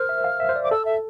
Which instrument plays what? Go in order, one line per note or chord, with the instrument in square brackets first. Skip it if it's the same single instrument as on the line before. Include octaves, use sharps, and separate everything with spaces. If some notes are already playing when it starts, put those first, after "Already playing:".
Already playing: [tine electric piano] A#4 C5 [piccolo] F6
[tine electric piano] E5
F5
E5
C5
D5
[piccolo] D6
[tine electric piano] A4 [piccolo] E6
[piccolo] E5